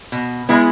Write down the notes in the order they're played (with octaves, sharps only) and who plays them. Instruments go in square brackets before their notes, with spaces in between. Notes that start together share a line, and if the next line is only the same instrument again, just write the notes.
[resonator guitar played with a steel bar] B2
G#3 B3 E4